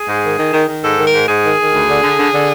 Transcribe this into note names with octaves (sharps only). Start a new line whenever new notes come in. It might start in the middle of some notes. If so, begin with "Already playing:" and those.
Already playing: G#4
G#2
D#3
D#3
D#3
D#3
G#2 A4
D#3
A#4
G#2
G#2 G#4
D#3
D#3
D2
D3
D3
D3
D3